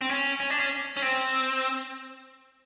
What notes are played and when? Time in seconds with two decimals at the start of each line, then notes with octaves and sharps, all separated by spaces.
0.01 C4
0.10 C#4
0.40 C#4
0.50 D4
0.60 C#4
0.97 C#4
1.02 C4